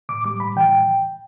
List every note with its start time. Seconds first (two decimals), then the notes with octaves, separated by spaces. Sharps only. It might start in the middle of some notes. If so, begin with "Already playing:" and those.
0.09 A2 D6
0.25 G3 D6
0.40 A2 B5
0.56 E3 G5
0.71 A2